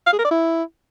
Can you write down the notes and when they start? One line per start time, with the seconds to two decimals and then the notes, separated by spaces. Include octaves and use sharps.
0.07 F5
0.13 G#4
0.19 A#4
0.25 D5
0.31 E4